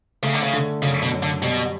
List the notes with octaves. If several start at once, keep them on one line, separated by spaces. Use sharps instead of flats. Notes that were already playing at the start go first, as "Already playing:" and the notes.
C#3 A3
D3
C#3
D3
F#2 C#3
B2
F#2
D3
B2 G3